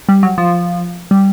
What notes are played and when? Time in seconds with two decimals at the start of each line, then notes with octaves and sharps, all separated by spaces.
0.09 G3
0.23 F#3
0.38 F3
1.11 G3